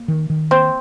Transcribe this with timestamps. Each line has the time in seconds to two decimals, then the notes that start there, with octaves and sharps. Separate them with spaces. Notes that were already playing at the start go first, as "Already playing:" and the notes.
Already playing: A#3
0.08 D#3
0.30 D#3
0.51 A#3 C4